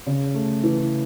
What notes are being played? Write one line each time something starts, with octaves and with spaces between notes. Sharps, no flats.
C#3
A3
E3